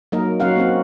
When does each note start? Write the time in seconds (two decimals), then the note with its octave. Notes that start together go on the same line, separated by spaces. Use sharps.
0.12 F#3 A#3 D#4 A#4 D#5
0.40 F#3 C#4 F#4 F5 F#5
0.56 A#3 C4 F#4